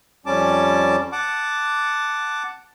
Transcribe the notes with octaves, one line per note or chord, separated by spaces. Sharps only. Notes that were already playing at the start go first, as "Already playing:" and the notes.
F2 G3 C#4 A5 D6
F#5 A5 D6